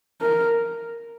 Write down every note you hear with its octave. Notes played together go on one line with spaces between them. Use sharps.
A#4